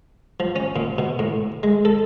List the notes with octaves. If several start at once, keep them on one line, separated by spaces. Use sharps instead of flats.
F3
C#4
A#2
B2
A2
G#3
A4